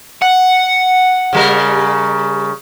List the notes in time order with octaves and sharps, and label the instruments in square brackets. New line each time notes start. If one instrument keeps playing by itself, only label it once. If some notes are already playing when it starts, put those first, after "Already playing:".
[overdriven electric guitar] F#5
[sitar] C#3 G3 A#4